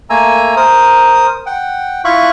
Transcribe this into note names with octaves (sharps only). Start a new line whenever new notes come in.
A3 A#3 G#5 A#5 E6
A#4 C5 D#6
F#5 G5
E4 F4 E5 F5 C#6 F#6